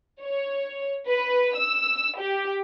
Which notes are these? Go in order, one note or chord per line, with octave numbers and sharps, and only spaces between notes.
C#5
B4
E6
G4